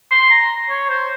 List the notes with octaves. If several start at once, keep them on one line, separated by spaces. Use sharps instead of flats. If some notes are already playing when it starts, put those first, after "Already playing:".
C6
A#5
C#5
C5